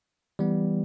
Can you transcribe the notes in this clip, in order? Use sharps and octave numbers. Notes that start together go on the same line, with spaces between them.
E3 G3 B3